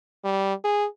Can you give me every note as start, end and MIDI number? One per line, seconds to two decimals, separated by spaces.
0.24 0.54 55
0.64 0.86 68